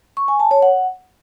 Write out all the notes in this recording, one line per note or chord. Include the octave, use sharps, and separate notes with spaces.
C#6
G#5
A5
C#5
F#5